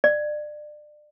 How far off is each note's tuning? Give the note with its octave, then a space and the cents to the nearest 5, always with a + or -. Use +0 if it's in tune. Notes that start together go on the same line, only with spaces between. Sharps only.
D5 +30